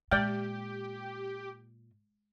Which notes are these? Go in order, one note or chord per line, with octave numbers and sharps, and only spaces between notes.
A#2 G#3 G4 D5 G5